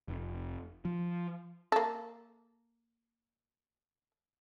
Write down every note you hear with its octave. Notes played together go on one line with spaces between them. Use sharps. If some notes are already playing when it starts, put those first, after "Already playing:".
F1
F3
A#3 A4